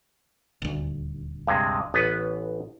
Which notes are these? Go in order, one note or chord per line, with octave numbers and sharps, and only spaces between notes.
D#1 D2
G2 C3 G#3
A1 B3 B4